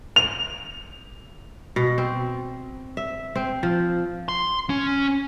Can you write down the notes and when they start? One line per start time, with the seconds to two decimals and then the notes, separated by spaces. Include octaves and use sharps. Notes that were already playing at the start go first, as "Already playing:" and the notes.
0.16 F7
1.76 B2
1.98 C4
2.97 E5
3.36 C4
3.63 F3
4.29 C6
4.70 C#4